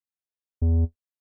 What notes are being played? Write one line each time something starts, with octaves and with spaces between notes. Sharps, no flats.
E2